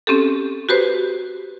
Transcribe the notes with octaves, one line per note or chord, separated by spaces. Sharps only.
C4 C#4 G4 A4
F#4 G4 B4 C5